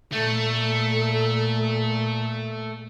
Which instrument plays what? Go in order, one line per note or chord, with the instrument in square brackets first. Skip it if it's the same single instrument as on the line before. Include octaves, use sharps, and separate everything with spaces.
[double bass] A#2 [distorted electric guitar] A3 [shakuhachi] A4